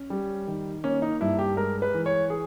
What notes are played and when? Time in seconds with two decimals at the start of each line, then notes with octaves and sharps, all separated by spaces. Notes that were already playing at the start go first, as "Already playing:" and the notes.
Already playing: C#4
0.10 G3
0.47 D#3
0.84 A#3 C#4
1.02 D#4
1.21 G2 E4
1.39 G4
1.57 G#3 A#4
1.82 B4
1.94 E3
2.06 C#5
2.30 G#4